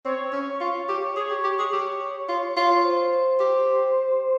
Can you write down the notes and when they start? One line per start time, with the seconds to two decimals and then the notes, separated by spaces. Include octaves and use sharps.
0.05 C4 C#5
0.33 C#4
0.61 F4
0.89 G4
1.17 G#4 C#5
1.30 G4
1.44 G4
1.59 G#4
1.73 G4
2.29 F4
2.57 F4
2.85 C5
3.40 G4